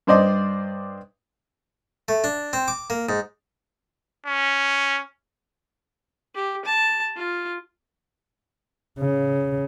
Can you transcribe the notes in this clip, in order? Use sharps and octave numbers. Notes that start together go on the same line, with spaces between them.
G2 C5 D5 D#5
A3
D4
C4
D6
A#3
G#2
C#4
G4
A5
F4
C#3